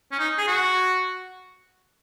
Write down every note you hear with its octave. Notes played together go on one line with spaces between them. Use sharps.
C#4
D#4
G#4
F#4